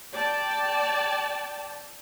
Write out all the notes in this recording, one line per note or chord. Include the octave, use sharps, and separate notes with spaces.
D5 G5 A5